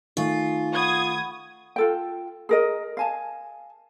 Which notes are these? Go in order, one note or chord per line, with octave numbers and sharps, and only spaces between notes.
D#3 A3 D#4 F4 A4 G#5 C#6
F#5 B5 C#6 D#6 G#6
F4 A4 G5
G#4 A#4 D#5
F5 G#5 A5